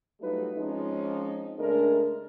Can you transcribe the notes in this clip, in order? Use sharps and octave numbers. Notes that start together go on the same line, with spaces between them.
F#3 G3 A3 D#4 F4 B4
F3 G#3 C4 C#4 D#4
C#3 G#3 A3 D4 A#4